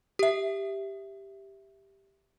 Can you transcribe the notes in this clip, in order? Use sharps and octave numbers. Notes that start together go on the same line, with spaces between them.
G4 E5